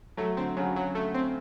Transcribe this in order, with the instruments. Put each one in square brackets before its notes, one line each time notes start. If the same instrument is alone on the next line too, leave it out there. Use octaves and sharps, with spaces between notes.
[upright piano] F#3 [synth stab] A3
[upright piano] D3 [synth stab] C4
[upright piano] C#3 [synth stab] F#3
[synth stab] F#3
A3
C4